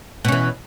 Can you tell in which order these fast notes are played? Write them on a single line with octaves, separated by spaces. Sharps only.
B2 C#4 E3